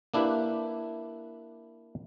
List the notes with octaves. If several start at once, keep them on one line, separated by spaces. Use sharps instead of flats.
A#3 D4 E4 G4 B4